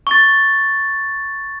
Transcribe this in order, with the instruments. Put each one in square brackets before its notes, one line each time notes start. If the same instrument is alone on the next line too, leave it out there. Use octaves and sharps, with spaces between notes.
[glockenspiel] C#6 A6